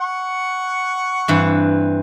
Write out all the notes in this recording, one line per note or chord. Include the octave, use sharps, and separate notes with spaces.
F#5 C#6
G2 E3 C4